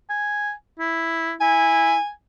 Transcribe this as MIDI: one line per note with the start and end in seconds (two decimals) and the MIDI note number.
0.10 0.52 80
0.79 1.33 64
1.41 1.96 64
1.41 2.10 80